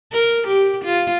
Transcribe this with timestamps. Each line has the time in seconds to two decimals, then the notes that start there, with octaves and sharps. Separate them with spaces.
0.13 A#4
0.48 G4
0.85 F4